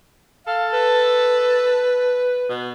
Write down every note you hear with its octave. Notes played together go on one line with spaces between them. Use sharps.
A4 F5
B4
B2